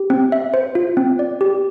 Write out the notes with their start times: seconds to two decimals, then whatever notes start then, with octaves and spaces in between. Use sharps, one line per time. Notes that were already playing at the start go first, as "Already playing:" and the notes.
Already playing: G4
0.10 C4
0.32 E5
0.54 C5
0.75 F4
0.97 C4
1.19 D5
1.41 G4